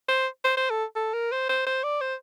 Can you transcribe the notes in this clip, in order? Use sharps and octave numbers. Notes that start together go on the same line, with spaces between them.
C5
C5
C5
A4
A4
A#4
C5
C5
C5
D5
C5